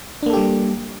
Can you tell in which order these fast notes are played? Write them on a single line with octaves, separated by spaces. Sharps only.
D4 A#3 A4 G4 G3